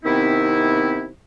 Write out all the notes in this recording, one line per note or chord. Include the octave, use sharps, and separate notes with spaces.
C3 D#3 B3 C4 D#4 E4